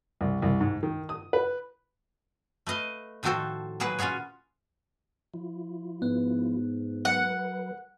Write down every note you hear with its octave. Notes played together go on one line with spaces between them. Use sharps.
C2
C2
G#2
D#3
D#6
B4
A3 B4 D#5 F5
A2 D#3 F3 F#4 A4 C5
A#2 F#3 G#4 B4 F#5
C#4 F4 F#4 G#4 C#5
F3 E4 F4
G#2 B3
F#3 A#4 B4 F#5